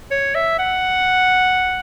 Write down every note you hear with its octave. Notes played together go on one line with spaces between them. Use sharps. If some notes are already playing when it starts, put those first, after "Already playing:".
C#5
E5
F#5